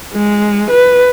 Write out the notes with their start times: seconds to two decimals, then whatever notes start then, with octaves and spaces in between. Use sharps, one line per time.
0.13 G#3
0.71 B4